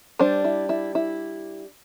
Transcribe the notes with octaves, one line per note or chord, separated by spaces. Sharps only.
G3 D4 C5
E4
E4
E4